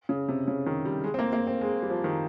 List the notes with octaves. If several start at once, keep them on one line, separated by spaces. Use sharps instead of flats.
C#3
C3
C#3
D#3
G3
G#3
C4
A#3
A#3
C4
G#3
G3
F3
D#3